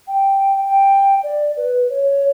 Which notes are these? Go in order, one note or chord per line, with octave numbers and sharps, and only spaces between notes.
G5
G5
D5
B4
C#5